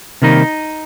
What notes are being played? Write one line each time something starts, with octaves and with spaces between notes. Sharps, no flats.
C3 D#3 G3 A#3 D#4